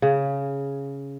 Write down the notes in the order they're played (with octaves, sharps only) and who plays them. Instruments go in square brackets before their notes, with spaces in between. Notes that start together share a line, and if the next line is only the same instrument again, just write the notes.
[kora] C#3